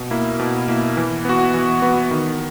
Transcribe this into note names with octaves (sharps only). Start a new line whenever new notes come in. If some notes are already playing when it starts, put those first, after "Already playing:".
Already playing: B2
A#3 E4
B2
A#3 E4
E3
B3 F#4
E3
B3 F#4
D#3